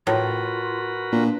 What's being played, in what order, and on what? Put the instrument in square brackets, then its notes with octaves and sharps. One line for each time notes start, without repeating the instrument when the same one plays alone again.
[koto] A2 [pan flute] F4 [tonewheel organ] F#4 A#4 B4
[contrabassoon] A#2 [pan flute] D4